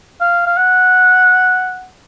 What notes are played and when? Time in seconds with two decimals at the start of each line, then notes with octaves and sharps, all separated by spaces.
0.21 F5
0.47 F5
0.57 F#5